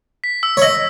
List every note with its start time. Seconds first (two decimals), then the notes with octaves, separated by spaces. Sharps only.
0.24 B6
0.43 E6
0.57 C#5
0.62 D#5 E6